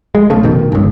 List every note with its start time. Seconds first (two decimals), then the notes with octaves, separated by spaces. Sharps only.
0.15 G#3
0.30 B1 C#3 A3
0.43 F1 B2 D#3
0.72 G1 C#2